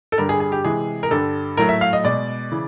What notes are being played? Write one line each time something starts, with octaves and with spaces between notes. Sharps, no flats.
A4
G2 D3 G3 A#4
G#4
G#4
G4
C3 E3 G#3 G#4
A#4
G2 D3 G3 A4
A2 F#3 A3 A#4
E5
F5
D#5
B2 G#3 D5
C#3 E3